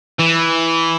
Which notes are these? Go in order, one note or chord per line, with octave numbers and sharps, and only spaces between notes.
E3